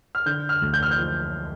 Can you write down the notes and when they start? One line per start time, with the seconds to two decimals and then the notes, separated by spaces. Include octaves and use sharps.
0.15 F6
0.26 D3 G6
0.49 F6
0.61 D2
0.74 G6
0.83 F6
0.91 G6
0.98 F3